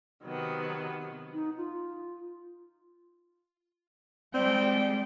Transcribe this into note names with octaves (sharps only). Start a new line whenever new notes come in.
C3 D#3 F#3 B3
D#4
F4
G3 G#3 C4 D5 G5